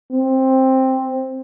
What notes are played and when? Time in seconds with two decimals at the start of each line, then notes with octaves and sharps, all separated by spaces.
0.11 C4